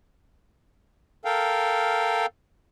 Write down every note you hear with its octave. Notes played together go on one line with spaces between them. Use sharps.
A4 A#4 F5 G5